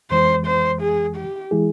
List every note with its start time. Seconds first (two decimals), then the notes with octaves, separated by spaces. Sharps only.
0.11 F2 E3 G#3 C5
0.46 C5
0.81 G#4
1.16 G4
1.51 E3 G#3 E4 G#4